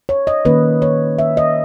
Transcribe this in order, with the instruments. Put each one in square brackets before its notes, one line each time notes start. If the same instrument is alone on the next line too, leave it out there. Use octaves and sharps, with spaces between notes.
[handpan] C#5
D#5
D#3 A#3 C#4 B4
C#5
E5
D#5